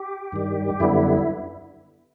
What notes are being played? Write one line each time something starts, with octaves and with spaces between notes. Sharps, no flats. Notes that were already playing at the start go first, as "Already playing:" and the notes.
Already playing: G4
G2 D#3 G3
F#2 D3 G3 B3 E4